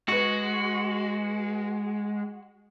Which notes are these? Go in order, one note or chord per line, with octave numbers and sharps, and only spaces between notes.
G#3 F#4 B4 C#6